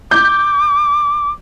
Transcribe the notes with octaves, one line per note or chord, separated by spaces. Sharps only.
D6 G6